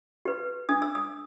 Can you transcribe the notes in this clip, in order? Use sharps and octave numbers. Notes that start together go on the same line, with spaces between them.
G4 B4
D4 D#6
E6
D#6